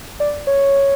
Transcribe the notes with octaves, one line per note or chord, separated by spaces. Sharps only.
D5
C#5